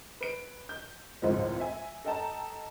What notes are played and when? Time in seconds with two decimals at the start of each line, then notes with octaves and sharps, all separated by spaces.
0.21 B4 D7
0.69 G6
1.22 G#1 C#2 A2 D#3 F3 G#3
1.60 E5 G#5
2.05 A4 D#5 G5 A5 A#5